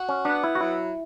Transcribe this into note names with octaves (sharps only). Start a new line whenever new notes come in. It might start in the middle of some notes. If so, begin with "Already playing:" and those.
Already playing: F#4
C#4
B3 D4
E4
F#4
F#3 E4